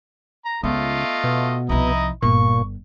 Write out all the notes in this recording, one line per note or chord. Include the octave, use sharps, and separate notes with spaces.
A#5
C#2 A3 B3 F4 D#5
B2
C2 F3 D#4 E4 D#5
G1 A#2 C#6